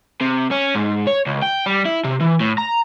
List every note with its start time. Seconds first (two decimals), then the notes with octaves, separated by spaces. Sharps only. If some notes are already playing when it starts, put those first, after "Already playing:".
0.21 C3
0.51 C#4
0.75 G#2
1.07 C#5
1.27 C#2
1.42 G5
1.66 G3
1.85 E4
2.04 C3
2.20 E3
2.40 A2
2.58 A#5